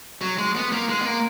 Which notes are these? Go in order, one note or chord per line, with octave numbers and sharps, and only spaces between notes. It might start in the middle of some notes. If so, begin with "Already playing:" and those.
F#3
G#3
B3
A#3
G#3
B3
A#3